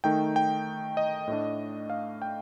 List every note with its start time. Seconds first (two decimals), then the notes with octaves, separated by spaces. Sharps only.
0.04 D#3 A3 D#4 G5
0.36 G5
0.97 D#5
1.28 A2 A3 D4
1.90 F5
2.22 G5